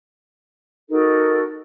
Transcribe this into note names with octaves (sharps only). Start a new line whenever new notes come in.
D#4 F#4 A4 A#4